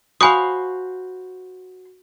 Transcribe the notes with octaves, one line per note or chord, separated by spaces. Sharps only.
F#4 C5 F5 G#5 B5 C#6 D#6